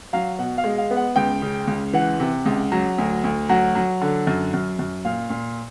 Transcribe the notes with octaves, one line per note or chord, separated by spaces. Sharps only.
F#3 F5
B2 F#5
F5
G#3
F5
B3
F#5
C#2 G5
C#3
C#2
E3 F#5
C3
C#2
F#3
D2
D2
F#3 F#5
F#3
D3
F#2
F#2
F#2
A#2 F5
A#2